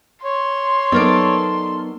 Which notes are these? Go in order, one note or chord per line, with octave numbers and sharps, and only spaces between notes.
C#5 C6
F#3 B3 D#4 A4 A#4 D5